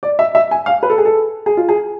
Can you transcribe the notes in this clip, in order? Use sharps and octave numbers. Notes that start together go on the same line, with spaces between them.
D5
E5
E5
G#5
F5
B4
A4
G#4
A4
G#4
F4
G#4